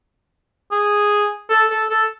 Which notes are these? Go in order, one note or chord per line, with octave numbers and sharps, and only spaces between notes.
G#4
A4
A4
A4